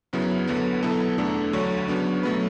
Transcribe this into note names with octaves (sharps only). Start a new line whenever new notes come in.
F#2 C#3 F#3 B3 E4
D2 D3 F#3 B3
B2 F#3 B3 E4 A4
E2 D3 A3 D4
D2 D3 F#3 C#5
C#3 F#3 B3 D4
B2 F#3 A3 B4